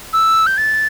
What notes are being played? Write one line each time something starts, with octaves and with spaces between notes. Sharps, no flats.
E6
G6
A6